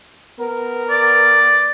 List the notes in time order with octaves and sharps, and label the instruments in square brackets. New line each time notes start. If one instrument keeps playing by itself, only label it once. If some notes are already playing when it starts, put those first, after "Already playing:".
[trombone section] B3 A#4
[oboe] D5